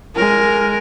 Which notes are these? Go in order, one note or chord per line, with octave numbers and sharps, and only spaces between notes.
G#3 A#4